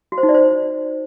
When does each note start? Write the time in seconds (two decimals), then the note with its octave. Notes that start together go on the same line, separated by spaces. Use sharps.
0.12 F#4
0.18 C5
0.23 D#4
0.29 D5
0.34 C5